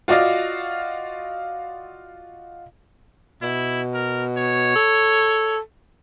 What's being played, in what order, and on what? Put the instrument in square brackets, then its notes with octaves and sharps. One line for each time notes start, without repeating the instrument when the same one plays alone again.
[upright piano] F4 F#4 D5 D#5 F5
[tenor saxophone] B2 [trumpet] E4
[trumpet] A#4
C#5
[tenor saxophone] A4